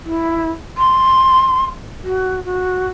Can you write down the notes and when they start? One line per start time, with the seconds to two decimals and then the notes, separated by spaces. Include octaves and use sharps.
0.05 E4
0.77 C6
2.04 F#4
2.45 F#4